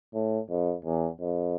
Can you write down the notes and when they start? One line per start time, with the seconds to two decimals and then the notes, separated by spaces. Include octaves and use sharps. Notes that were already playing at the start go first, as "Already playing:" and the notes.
0.14 A2
0.50 F2
0.85 E2
1.21 F2